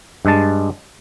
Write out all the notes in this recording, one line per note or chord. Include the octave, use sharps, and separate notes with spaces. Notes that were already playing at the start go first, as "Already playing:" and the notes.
G2 G#3 A5